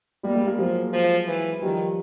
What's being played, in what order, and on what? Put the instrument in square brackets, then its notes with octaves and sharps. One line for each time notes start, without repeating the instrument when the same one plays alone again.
[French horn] G3 [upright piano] G#3 A#3
[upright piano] G#3 A#3
G#3 A#3
[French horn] F3 [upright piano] F#3 G#3
[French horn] F3
E3
[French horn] D#3 [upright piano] F3 G3